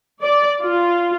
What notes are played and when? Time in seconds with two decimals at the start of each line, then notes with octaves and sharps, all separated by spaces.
0.22 D5
0.62 F4